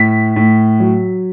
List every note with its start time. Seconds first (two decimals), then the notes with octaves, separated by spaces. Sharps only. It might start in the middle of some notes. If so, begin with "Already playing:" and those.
Already playing: A2 B6
0.36 A2
0.80 F#3